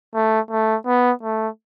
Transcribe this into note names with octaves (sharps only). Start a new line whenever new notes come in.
A3
A3
B3
A3